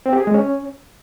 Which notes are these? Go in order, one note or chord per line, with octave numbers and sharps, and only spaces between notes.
C4
G4
G#4
G#3
C#4